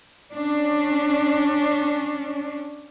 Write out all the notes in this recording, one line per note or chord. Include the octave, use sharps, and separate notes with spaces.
C#4 D4